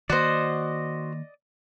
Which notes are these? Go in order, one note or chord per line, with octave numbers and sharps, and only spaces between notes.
D#3 A#3 F#4 C5 D5 D#5